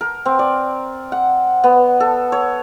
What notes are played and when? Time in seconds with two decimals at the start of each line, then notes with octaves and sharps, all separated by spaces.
0.01 A#4
0.26 C4
0.39 D5
1.12 F#5
1.64 B3
2.00 A4
2.32 C#5